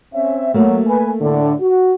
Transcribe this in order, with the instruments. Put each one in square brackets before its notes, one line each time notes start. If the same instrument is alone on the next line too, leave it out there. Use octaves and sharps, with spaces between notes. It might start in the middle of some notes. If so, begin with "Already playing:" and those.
[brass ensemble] C4 C#4 E5
[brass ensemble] F#3 [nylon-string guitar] A3 A#3
[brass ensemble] B4 G#5
A2 D3
F#4